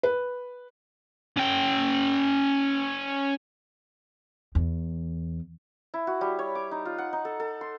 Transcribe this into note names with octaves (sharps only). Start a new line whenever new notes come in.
B4
C#4 G5
E2
E4
F#4
G3
C#5
D6
D#4
F4
F#5
D#4
A4
A4
C6